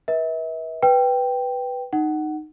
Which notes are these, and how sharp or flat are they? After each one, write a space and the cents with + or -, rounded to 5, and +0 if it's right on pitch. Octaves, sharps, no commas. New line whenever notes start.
B4 -35 E5 -40
B4 +0 G5 +0
D#4 -15 F#5 +15